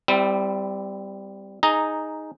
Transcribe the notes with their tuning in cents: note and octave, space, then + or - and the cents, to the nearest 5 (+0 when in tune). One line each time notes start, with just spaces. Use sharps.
G3 +0 C4 -30 E4 +0
D#4 +0 G#4 +0 A#5 -5